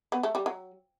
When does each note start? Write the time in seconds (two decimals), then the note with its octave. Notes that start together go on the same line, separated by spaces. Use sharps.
0.12 B3
0.23 A3
0.35 G3
0.46 F#3